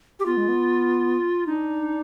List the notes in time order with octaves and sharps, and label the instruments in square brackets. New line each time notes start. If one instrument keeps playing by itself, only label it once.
[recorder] G4
[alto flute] B3 [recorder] F4
[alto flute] G#3
B3
[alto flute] D4 [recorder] D#4